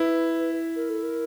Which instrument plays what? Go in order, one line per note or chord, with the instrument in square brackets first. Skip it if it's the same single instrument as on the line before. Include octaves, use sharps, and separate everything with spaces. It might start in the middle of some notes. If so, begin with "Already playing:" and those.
Already playing: [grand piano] E4 [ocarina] B4
[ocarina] A#4
A4
A#4